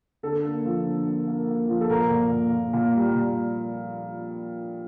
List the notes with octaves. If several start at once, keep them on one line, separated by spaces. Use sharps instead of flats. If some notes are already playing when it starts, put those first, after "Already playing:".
D3 A4
A#3
F3
D3
A#3
A#3
A#3
F3
A4
A#2 A#4
A#2
A#2
A#2
A#2
G3
A#2